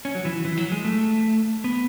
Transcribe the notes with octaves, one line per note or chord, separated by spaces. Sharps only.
C#4
F#3
E3
E3
F#3
G#3
A3
B3